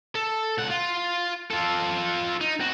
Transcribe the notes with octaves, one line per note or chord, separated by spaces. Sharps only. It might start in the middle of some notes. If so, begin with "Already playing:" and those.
A4
C#2 F#5
F4
F4 A4
D#4
C3 F#4